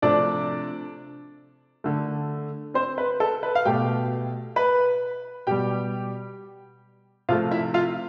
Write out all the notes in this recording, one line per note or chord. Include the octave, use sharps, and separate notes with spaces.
C3 F3 A3 D4 D5
D3 A3
C4 C5
B4
A4
B4
F5
B2 A3 G4 G5
B4 B5
B2 G3 G4 G5
C3 F3 A3 F4 F5
E4 E5
F4 F5